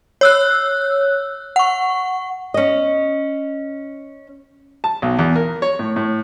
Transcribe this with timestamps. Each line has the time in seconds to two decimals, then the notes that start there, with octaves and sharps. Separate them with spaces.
0.21 C#5 E6 F#6
1.56 F#5 C#6
2.54 C#4 D#5
4.84 A5
5.02 B1
5.19 E2
5.36 A#4
5.62 C#5
5.79 A2
5.96 A2